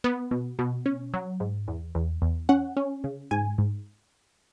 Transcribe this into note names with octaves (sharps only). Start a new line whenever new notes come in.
B3
B2
B2
C#4
F#3
G#2
E2
E2
E2
C#4 F#5
C#4
C#3
G#2 G#5
G#2